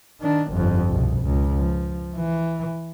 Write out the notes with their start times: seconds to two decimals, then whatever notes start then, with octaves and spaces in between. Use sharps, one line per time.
0.21 D#3 D4
0.53 G1 F2
0.89 C2 B2
1.22 C#2
1.58 F3
2.16 E3